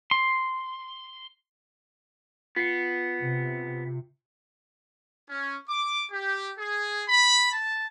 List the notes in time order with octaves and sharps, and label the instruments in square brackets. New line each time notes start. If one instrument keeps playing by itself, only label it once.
[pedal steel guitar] C6
[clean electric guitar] B3 [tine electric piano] F4 C7 C#7
[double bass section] C3
[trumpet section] C#4
D6
G4
G#4
B5
A5